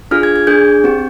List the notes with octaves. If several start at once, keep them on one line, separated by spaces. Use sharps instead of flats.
D4 F4 G#4 F6
G#6
G#6
D4 G#4 G6
C4 G4